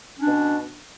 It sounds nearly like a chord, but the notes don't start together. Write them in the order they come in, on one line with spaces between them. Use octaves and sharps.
C#4 D4 B2